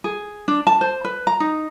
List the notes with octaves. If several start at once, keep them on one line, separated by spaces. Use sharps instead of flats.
G#4
D4
A5
C5
B4
A#5
D#4